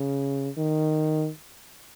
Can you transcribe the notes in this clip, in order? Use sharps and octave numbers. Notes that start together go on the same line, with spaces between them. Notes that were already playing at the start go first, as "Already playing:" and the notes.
Already playing: C#3
D#3